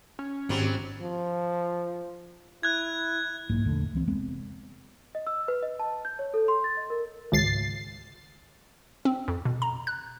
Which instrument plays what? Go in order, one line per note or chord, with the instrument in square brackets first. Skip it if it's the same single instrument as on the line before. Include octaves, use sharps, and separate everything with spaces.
[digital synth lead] C#4
[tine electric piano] G#1 [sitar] F#3 G3 C4
[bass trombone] F3
[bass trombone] E4 [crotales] F#6 G#6
[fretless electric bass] B1 G#2 A#3
A#1 E2 D3 A3
C#2 E3 C4
F1 G#3 B3 C4
[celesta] D#5
E6
B4
D#5
A5
G6
C#5
A4
C6
A6
D#5
A#4
[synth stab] G#1 C#2 A6 C7
[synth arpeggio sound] C4
F2
B2
A#5
F#6